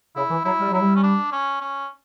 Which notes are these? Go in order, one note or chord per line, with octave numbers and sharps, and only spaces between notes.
C#3 E4
E3
F#3 E4
G3
F#3 E4
G3
C#4
D4
C#4
C#4